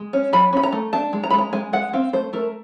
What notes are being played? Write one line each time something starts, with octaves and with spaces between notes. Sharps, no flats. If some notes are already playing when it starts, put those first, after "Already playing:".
Already playing: G#3
C#4
F#3 B5
C#4 B5
A#5
A3
D4 A5
G#3
A#5
B5
G#3 A#5
G#3 G#5
G#3 F#5
C4 F5
A3 C5
A3 A#4